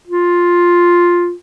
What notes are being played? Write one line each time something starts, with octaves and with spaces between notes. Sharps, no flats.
F4